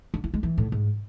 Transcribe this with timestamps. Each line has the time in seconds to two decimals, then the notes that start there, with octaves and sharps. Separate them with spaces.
0.14 D4
0.24 E4
0.34 G#3
0.43 E3
0.58 A2
0.72 G#2